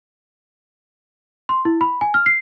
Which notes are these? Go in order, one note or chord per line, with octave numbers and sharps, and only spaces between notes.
C6
E4
B5
G#5
F6
C7